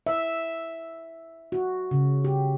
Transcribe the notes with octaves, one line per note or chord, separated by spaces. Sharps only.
E5
F#4
C#3
G4